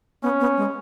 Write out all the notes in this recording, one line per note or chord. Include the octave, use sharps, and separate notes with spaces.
B3 C#4
B3
G#3